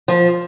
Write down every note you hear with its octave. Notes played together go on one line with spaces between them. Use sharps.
F3